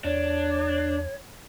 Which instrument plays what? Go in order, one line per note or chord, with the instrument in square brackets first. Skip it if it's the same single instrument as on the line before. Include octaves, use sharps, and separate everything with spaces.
[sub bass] E2 [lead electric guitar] D4 [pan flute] C#5